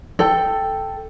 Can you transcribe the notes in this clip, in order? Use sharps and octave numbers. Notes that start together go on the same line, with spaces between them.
A4 G5